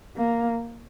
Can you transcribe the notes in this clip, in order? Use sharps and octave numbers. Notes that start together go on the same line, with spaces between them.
A#3